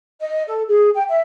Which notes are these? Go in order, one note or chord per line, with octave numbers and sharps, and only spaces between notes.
D#5
A4
G#4
G5
E5